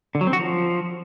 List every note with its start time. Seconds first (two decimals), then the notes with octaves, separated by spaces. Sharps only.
0.15 D3
0.21 F#3
0.27 C4
0.33 F#4
0.39 F3